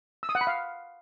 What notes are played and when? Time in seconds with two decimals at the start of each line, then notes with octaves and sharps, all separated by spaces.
0.23 E6
0.29 D#6
0.35 F#5
0.41 B5
0.47 F5